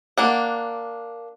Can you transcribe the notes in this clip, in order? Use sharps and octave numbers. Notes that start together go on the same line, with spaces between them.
A#3 D4 F#5